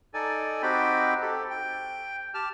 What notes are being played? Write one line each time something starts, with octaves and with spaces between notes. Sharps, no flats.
D#4 A4 D5 G#5
C4 D#4 F#4 G4 G5 B5
G4 A4
G5
G4 A5 F6